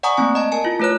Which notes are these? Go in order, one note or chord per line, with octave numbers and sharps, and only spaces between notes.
D5 F#5 G#5 A#5 C#6 D#6
A3 A#3 C4 G#5
D#5 A5
A#4 G#5 A5
E4 F4
A3 F4 B4 C#5 F#6